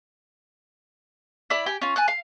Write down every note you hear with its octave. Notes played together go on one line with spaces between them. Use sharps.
E4 D5 B5
G4 G5 G#5
C#4 F4
G#5 A5 F#6
F5